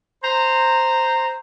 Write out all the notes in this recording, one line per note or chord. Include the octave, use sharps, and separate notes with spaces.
C5 A#5